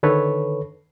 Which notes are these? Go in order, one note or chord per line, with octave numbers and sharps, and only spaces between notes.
D3 D#3 A4 B4 C#5